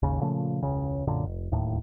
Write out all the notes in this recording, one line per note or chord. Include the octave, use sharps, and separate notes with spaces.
G#1 D#2 C#3
A#2 C#3 F3 A3
E1 C#2 C#3
B1 F#2 A#2 D3
F1
D1 D#2 A2